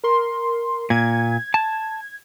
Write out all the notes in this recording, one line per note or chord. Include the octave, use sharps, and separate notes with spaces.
A#4 C6
A#2 G#6
A5